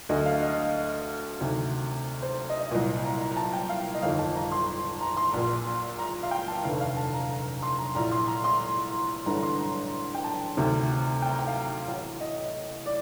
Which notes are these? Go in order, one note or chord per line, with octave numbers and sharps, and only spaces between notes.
D2 D3 D#5
F5
D#5
D2 C3 D#3
C5
D#5
D#5
C2 A#2 D#5
A#5
A#5
A#5
A5
G5
F5
D#5
G1 F2 D#3 F5
A5
A#5
C6
A#5
C6
A#1 A#2
A#5
F5
G5
A5
F1 D#2 D3 F5
F5
A5
A#5
A#5
C6
A#5
A#1 A2 A#5
C6
A#5
C6
A1 G2 D3 A#5
A#5
C6
A#5
G5
A5
D2 C3 D#3
G5
A#5
G5
F5
A1 A2
D#5
D5